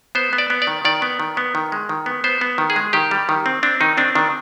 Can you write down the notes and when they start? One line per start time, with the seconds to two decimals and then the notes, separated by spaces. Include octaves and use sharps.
0.15 B3 C5
0.33 B3
0.38 D5
0.50 B3
0.62 D5
0.67 D#3
0.85 D#3 D5
1.02 B3
1.20 D#3
1.37 B3
1.55 D#3
1.72 G#3
1.89 D#3
2.06 B3
2.24 B3 C5
2.41 B3
2.58 D#3
2.70 G#4
2.76 G#3
2.93 D#3 G4
3.11 G3
3.29 D#3
3.46 C4
3.63 C4 D4
3.81 D#3 D#4
3.97 C4 D4
4.15 D#3 D4